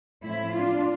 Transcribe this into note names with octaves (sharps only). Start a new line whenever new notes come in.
A2 F3 C4 E4
D4 F4